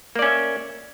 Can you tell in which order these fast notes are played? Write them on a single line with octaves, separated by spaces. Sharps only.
A#3 D5 C#4 E5